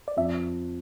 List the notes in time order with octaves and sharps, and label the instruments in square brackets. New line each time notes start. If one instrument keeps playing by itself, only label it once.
[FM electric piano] D5
[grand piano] F2 [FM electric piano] E5